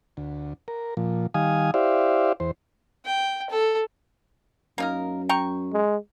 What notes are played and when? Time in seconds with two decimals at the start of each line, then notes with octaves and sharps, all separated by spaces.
0.17 D2
0.68 A#4
0.97 A#2 F3
1.34 D#3 G3 F5 G#5 D#6
1.74 E4 G4 C5 D5 E5 F5
2.40 E2 C5
3.05 G5
3.50 A4
4.78 F#2 A#3 D#4 A#4
5.29 G5 A#5 C#6
5.73 G#3